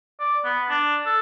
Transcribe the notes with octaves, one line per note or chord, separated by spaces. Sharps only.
D5
B3
D4
A4